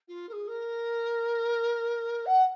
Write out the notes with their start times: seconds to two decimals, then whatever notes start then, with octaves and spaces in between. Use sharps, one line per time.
0.08 F4
0.29 A#4
0.32 G#4
0.48 A#4
2.26 F#5